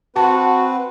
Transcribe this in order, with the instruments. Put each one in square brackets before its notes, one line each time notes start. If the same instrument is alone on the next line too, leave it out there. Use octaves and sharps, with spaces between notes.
[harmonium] C4 B4 [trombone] F#4 [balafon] A5